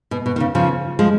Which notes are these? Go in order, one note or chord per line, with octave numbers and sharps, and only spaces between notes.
B2
B2
D#3
C#3
C#3 F3
F3 G#3